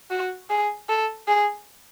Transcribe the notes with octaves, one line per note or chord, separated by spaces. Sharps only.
F#4
G#4
A4
G#4